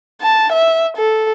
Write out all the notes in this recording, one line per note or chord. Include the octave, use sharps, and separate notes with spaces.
A5
E5
A4